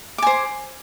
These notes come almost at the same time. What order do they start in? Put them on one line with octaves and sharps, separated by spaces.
D6 G#5 C5